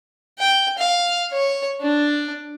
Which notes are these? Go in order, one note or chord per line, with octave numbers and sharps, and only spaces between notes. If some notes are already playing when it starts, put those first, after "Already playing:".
G5
F5
C#5
D4